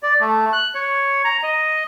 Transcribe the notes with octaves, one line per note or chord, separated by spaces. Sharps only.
D5
A3
F#6
C#5
A#5
D#5